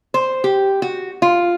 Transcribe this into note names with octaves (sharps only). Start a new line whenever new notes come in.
C5
G4
F#4
F4